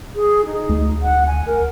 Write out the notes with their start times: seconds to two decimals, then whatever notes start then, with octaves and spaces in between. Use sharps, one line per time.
0.16 G#4
0.46 D#4
0.69 D2
1.02 F#5
1.27 G#5
1.46 A#4